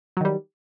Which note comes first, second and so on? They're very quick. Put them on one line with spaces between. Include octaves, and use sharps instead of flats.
F#3 D#3 G3